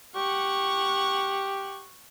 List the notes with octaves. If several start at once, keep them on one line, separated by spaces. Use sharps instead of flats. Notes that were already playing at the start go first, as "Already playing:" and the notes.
G4 F#5 C#6